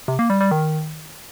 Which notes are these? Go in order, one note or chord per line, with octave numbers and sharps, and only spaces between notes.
C3
A#3
G3
G3
D#3